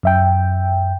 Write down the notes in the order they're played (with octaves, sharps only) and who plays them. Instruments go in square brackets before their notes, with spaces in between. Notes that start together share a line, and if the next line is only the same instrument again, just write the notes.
[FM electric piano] F#2 E5 G5